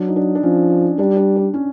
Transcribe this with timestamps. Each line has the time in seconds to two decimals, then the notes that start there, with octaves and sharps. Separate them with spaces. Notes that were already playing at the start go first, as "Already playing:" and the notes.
Already playing: F#3 D4
0.08 D#4
0.16 D4
0.35 D4
0.43 F3 C#4
0.99 G3 D4
1.17 D4
1.36 D4
1.54 C#4